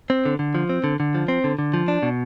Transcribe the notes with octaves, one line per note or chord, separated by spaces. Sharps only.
C4
D3
D3
F3
C4
D3
D3
F3
C4
D3
D3
F3
D4
B2